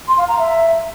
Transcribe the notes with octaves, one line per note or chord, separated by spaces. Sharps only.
C6
F5
A#5
E5